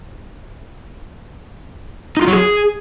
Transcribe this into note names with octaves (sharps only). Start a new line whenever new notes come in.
D#4
F4
F#3
G#4